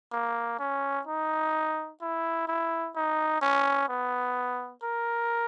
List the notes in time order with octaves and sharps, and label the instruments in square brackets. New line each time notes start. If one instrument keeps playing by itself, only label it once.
[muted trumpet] A#3
C#4
D#4
E4
E4
D#4
C#4
B3
A#4